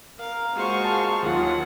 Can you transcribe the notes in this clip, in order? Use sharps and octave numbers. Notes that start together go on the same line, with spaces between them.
A#4 F5
G#3 A#3 F4 F#4 C5 F5 C#6
A5
D#2 F#3 F4 G#4 F#5